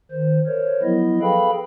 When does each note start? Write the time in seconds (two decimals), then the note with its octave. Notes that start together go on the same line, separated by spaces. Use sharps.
0.11 D#3 C5
0.47 A#4 C5 C#5
0.83 F3 F#3 B3 E4 D#5
1.22 G#4 A4 B4 F5 G5 B5